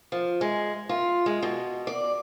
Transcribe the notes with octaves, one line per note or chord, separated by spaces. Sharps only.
F3
G#3
F4
G#3
B2
D5